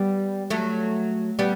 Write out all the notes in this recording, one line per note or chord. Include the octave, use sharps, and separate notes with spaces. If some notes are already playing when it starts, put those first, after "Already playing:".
Already playing: G3 B3
F#3 A3
G3 B3